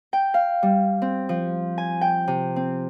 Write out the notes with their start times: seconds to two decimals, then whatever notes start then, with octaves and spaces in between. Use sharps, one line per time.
0.13 G5
0.34 F5
0.63 G3
1.02 C4
1.29 F3
1.78 G#5
2.01 G5
2.28 C3
2.56 C4